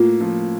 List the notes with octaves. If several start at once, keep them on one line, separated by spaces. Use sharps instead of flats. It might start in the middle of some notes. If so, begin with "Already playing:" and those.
Already playing: A2 A#3 F4
F3